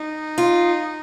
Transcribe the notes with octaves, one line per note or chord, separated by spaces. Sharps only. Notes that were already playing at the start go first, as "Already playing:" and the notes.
Already playing: D#4
F4